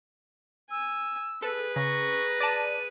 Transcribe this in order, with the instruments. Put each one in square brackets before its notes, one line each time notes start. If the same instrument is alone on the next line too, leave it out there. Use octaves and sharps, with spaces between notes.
[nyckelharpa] G#5 [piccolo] E6
[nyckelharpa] G#4 B4 [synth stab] A4
[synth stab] C#3 [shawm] A#5 [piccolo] C#6
[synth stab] D5 A5 [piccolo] D#7